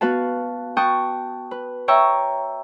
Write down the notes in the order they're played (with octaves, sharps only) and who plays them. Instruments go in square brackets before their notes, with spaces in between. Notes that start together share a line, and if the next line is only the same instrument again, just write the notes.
[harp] B3 F#4 B4 F5 A5
G5 A5 C#6 D#6 F#6 G6
B4
C#5 E5 G5 A#5 C#6 E6